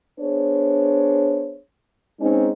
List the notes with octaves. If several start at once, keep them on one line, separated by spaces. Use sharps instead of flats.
B3 D4 G#4 C5 C#5
G#3 C4 C#4 D#4